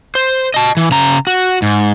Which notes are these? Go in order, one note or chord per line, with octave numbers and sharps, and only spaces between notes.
C5
D#5 A5
E3
C#3 A#5
F#4
G#2